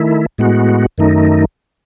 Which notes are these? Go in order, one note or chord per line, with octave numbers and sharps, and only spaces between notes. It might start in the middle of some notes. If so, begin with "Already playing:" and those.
Already playing: D#3 A3 E4
A2 G#3 B3 F#4
F#2 D#3 A3 D#4